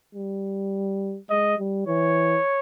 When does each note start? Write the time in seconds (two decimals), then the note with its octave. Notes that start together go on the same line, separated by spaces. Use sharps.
0.15 G3
1.30 G#3 D#5
1.58 G3
1.86 E3 C#5